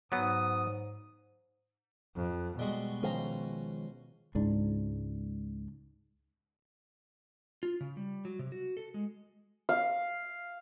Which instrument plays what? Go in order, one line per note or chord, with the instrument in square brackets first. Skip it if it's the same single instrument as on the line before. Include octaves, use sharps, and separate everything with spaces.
[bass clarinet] G#2 [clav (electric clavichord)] F#3 B3 [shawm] D#6
[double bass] F2
[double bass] B2 [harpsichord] G3 G#3 F#4
[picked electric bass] D#3 F3 G#3 [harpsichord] C#4 C5 A#5
[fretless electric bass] C#2 G#2 D4
[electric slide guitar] F4
C#3
G3
F#3
C3
F#4
A4
G#3
[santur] F5